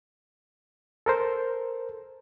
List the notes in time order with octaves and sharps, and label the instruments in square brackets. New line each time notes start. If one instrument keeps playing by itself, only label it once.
[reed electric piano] A4 A#4 C5